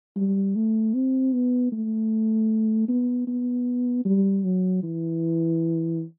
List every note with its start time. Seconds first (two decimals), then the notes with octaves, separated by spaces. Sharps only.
0.16 G3
0.55 A3
0.94 C4
1.33 B3
1.72 A3
2.88 B3
3.27 B3
4.05 G3
4.44 F#3
4.83 E3